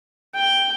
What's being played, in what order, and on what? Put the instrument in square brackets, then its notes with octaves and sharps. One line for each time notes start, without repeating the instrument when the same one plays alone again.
[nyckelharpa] G5